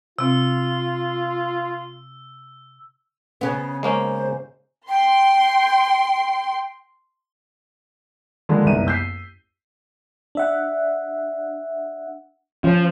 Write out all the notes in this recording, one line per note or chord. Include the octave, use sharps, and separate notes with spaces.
C3 C4 F4 E6
C#3 B3 C#4
G#3 A#3 C#4 C5
G5 C6
D3 D#3 F3 G#3 A#3
F#1 C2 B3 D#4 D#7
E6 G6 B6 C7
D4 E5 F#5
F3 C#4